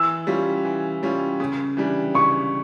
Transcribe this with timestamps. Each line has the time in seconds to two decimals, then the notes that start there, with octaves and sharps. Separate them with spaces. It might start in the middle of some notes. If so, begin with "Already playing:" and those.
Already playing: E3 E6
0.27 G3 C#4 F4
0.65 E3
1.03 G3 C#4 F4
1.40 C#3
1.77 E3 G3 D4
2.14 C#3 C#6